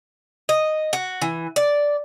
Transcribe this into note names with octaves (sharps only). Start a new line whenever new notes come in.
D#5
F#4
E3
D5